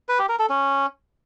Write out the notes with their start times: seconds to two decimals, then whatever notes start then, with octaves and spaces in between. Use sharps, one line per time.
0.09 B4
0.19 G4
0.29 A#4
0.39 A4
0.50 C#4